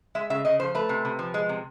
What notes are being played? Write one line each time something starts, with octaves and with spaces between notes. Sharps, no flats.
G#3 E5
C#3 E5
C#3 D#5
F3 C5
A3 B4
C3
C3
F3
G#3
C3